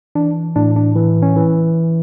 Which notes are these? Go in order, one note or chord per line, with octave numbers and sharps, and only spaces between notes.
E3 D4
A2 D4
D4
E3
C#4
E3